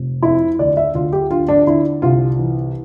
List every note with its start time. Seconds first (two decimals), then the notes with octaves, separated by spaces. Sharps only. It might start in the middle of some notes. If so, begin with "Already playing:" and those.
Already playing: F1
0.23 F2 E4
0.59 D2 D5
0.77 E5
0.95 D2 F4
1.13 G4
1.31 D3 F4
1.48 D4
1.67 D3 E4
2.02 C2 F4
2.39 E3